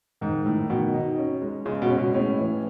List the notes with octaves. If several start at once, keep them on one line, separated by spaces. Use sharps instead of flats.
G#2 D#3
A2 D#3
B2 D#3
D#4
C#4
G#3
C#3 G#3
B2
C#4
B2
A2 C#4
E3